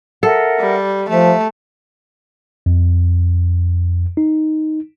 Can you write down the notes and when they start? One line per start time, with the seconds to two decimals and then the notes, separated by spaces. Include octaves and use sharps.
0.23 A4 A#4 E5 F#5
0.60 G3
1.09 F3 A3 E5
2.66 F2
4.17 D#4